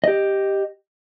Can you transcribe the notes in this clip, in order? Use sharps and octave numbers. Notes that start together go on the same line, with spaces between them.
G4 D#5